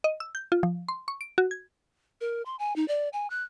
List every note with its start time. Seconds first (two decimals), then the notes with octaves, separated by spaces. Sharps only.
0.04 D#5
0.20 E6
0.35 G6
0.52 F4
0.63 F3
0.88 C6
1.08 C#6
1.21 D7
1.38 F#4
1.51 G#6
2.21 A#4
2.46 C6
2.59 G#5
2.76 D#4
2.88 D5
3.13 G#5
3.30 F#6